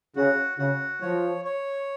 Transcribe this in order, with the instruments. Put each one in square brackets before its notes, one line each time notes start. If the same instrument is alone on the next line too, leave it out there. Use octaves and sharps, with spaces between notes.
[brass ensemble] C#3 [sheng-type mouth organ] F#4
[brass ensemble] C#3 [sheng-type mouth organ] F#4
[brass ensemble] F3 [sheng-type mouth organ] C#5
[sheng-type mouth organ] C#5